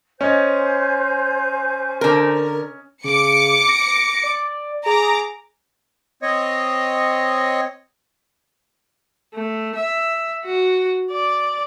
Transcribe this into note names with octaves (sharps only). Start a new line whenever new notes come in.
C#4 C5 C#5 D#5 G#5 G6
D3 A#4
C#3 D6 C#7
A#6
D5
G#4 A#5 D6
C4 C#5 D#5
A3
E5
F#4
D5